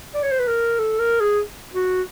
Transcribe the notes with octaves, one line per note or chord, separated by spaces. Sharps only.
D5
C#5
C5
B4
A#4
A4
A#4
G#4
F#4